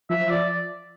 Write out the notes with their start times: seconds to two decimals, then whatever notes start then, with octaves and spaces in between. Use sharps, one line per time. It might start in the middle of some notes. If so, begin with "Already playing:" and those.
0.10 F3 E5
0.30 D5